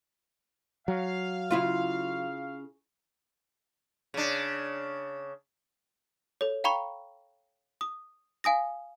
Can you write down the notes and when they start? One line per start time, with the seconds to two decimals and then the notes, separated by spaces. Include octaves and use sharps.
0.88 F#3 F5
1.51 C#3 E4 F4
4.14 C#3 D4
6.41 A4 C#5
6.64 F5 G5 A#5 B5 C#6
7.81 D#6
8.44 F5 G#5 D#6 A#6